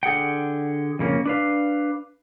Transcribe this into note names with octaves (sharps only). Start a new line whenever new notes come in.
D3 G#4 F#5 G5
F2 C#3 A#3 C#4
D4 B4 F5